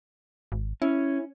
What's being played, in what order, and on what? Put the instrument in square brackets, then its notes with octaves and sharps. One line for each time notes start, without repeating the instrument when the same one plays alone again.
[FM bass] G#1
[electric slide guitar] C#4 [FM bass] E4